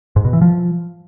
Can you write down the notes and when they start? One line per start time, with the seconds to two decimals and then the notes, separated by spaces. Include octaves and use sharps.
0.16 G#2
0.25 B2
0.33 E3
0.42 F3